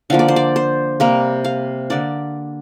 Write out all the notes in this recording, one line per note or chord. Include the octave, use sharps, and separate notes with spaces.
D3 F3 A#3 F5
D5
C5
D5
C5
C3 G3 A#3 A#4
F5
D3 A#3 D5